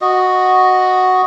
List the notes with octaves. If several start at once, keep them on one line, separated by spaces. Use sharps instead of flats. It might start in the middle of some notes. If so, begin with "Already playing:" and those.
F#4 D#5